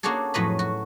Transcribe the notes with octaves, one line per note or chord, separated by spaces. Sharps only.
A#3 C#4 D4 F#4 G#4 A4
F2 A2 F#3 B4 D#5 B5
F#4